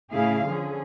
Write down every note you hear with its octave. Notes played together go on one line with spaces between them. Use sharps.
A2 C#3 E4 G#4 F5
D3 F3 C#4 G#4